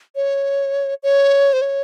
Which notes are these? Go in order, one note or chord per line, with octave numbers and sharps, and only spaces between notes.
C#5
C#5
C5
C#5